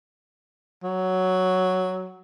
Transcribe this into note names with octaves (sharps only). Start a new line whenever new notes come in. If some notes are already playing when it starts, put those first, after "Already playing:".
F#3